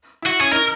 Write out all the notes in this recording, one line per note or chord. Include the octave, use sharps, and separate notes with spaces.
E4 F#4
C#4 G#4
D#4 A#4